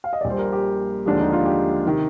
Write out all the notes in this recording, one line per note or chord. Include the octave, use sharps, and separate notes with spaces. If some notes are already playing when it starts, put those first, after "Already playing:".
F5
D#5
D5
A#1 A#2 G3 C5
A#4
G4
D#2 D3 F3 G#3 D4
D#4
F4
G4
C3 D#3